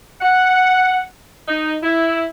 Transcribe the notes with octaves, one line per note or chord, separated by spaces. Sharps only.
F#5
D#4
E4